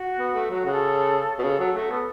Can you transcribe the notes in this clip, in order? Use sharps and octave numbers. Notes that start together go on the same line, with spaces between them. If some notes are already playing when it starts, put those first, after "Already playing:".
Already playing: F#4
B3
A3
F#3 F#4
C#3 F#4
A4
B2
C#3 A4
F#3
A3 F#4
B3 A4